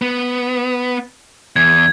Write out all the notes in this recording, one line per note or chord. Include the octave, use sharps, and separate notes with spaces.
B3
E2 G#6